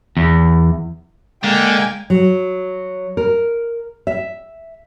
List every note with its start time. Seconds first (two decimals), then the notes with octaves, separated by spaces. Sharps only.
0.17 E2
1.44 D3 G#3 A#3 G5 G#5
2.10 F#3
3.17 A#4
4.07 E5